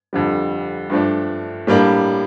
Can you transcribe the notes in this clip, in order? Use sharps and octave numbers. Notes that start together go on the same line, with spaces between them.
F2 D3 G3
G2 F3 A3 D4
A2 G3 A#3 D4